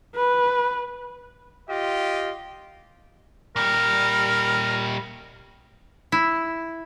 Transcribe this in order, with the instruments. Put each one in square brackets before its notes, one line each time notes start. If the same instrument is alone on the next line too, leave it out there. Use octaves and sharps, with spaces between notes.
[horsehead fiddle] B4
[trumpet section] F4 G4 D#5
[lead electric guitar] A#2 G3 [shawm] A#4
[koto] E4